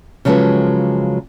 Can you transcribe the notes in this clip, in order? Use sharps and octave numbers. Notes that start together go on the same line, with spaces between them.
C#3 F3 F#3 G#3 A4 B4